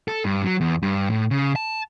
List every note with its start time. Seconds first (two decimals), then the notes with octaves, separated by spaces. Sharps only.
0.08 A4
0.25 G2
0.44 F#3
0.61 E2
0.82 G2
1.10 A2
1.31 C#3
1.56 A5